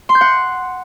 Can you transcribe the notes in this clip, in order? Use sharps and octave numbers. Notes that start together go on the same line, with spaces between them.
C6
G6
F#5